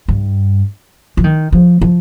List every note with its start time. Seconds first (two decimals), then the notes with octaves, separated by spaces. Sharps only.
0.08 G2
1.17 F3
1.24 D#3
1.53 F3
1.81 F3